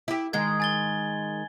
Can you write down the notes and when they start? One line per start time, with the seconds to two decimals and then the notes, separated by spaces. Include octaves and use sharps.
0.08 E4 G4
0.33 D#3 G#3 G#4 G#6
0.60 G#5 A6 G7